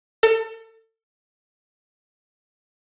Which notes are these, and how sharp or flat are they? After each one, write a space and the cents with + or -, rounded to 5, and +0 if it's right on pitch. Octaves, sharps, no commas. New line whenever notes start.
A4 +30